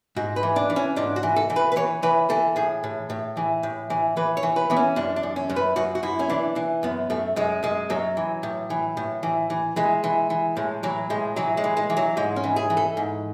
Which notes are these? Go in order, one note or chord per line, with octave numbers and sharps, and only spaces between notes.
G#2 F#4
B4
E3
D4
E3
C#4
G#2 D4
F#4
E3
A4
E3
B4
B4
E3 C#5
E3 B4
E3 A4
A2 G#4
A2
A2
E3
A2
E3
E3 B4
C#5
E3
B4
E3 B3
C#4
F#2 D4
D4
F#2
C#4
F#2
B4
F#2 F#4
F#4
F#2 E4
C#4
E3 D4
E3
F#2 B3
F#2 A3
F#2 G#3
F#2 G#3
F#2 F#3
E3
A2
E3
A2
E3
E3
E3 G#3
E3
E3
A2 G#3
E3 F#3
A2 G#3
E3 F#3
G#3
E3
G#3
E3
F#3
G#2 G#3
C#4
E3
G#4
E3
A4
G#2